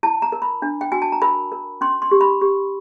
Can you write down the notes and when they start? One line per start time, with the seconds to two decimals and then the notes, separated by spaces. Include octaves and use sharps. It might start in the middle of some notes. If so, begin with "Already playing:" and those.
0.03 E4 A5
0.22 A#5
0.32 A#4
0.42 B5
0.62 D4
0.81 G5
0.92 F#4 G#5
1.02 A5
1.12 A#5
1.22 A#4 B5
1.52 A#4
1.81 C#4 C6
2.02 C6
2.11 G4
2.21 B5
2.41 G4